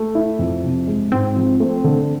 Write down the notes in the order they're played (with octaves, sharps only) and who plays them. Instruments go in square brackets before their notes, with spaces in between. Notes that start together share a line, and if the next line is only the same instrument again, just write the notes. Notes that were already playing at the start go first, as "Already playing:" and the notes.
Already playing: [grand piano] A3
E4
F2
C3
G#3
[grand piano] G#2 [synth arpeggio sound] C4
[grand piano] F3
A3
D3